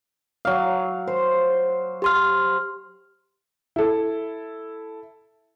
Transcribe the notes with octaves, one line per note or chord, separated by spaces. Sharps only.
F#3 F5
C5
G4 C6 F6
E4 A4